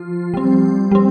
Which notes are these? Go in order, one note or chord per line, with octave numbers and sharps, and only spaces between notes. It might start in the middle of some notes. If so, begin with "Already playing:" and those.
Already playing: F3 F4
G3 C4
G3 C4